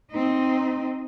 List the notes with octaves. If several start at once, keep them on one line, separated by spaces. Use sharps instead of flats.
C4 D#4